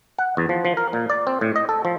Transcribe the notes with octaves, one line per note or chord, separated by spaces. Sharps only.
F#5
E2
F3
F3
A#4
A#2
D5
C4
A2
D#5
A4
F3